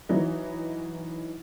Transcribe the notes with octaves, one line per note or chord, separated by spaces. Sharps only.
E3 F#3 D#4 E4